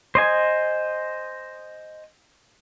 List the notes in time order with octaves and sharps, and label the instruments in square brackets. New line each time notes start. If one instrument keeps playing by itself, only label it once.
[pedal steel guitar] C5 D#5 G#5